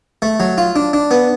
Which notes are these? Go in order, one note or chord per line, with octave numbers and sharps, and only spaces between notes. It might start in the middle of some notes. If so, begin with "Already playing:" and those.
A3
F#3
F4
D4
D4
B3